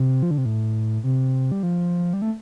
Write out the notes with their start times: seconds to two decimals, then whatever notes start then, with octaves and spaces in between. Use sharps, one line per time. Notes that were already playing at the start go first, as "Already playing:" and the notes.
Already playing: C3
0.23 F3
0.31 D3
0.38 C3
0.45 A2
1.04 C3
1.52 G3
1.63 F3
2.14 G3
2.22 A3